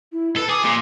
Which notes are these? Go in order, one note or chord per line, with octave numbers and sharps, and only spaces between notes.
E4
A4 B4
G#4 D6
A#2